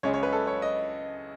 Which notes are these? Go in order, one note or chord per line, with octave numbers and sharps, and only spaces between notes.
C#2 C#3 G#3 C#4 C#5
C#5
B4
A4
C#5
D#5